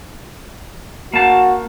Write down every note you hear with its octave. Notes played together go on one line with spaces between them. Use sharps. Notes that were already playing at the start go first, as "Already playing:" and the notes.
A#3 F#4 A5